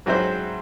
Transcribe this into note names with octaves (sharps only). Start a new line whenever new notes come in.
G#2 F#3 C4 E4 C5